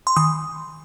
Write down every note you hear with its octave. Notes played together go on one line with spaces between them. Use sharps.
C6
D#3 D#6